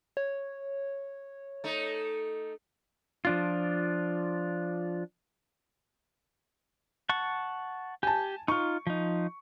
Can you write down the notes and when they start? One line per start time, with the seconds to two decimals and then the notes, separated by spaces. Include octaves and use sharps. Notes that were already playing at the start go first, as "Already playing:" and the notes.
0.17 C#5
1.64 A3 D#4
3.25 F3 D4 F4
7.09 F#5 A5 C#6
8.03 G4 G#5 A5
8.48 D#4 F4 C#6
8.87 F3 D#4